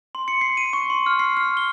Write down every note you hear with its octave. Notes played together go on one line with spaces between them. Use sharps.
C6
C#7
C7
D#7
C#6
C6
F6
C7
F6
G7